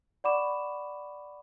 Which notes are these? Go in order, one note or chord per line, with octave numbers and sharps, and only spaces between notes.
D5 F#5 B5 C#6 D6 E7